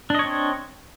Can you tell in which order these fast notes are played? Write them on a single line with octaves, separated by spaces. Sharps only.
D4 D#5 C#5 C4